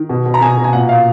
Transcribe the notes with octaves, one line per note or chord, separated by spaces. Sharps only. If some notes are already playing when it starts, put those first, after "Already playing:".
Already playing: D#3
B2
B2
A#5
B2 G#5
B2
G#5
A#2 F#5
F5